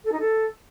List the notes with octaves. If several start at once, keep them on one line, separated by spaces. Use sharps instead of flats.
A4
D#4
A4